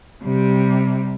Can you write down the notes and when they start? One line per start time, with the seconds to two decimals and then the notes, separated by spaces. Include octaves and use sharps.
0.23 C3 G3